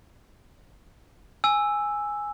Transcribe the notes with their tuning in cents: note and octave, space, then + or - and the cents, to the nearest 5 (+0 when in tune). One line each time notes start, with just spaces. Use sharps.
G#5 +0 E6 +0